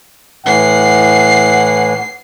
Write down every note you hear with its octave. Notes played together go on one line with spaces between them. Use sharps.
A2 E3 F#5 C7